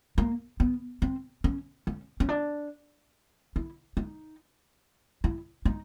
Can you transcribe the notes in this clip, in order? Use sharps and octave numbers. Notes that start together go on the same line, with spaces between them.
A#3
B3
C4
C#4
C#4
C#4
D4
E4
D#4
E4
D#4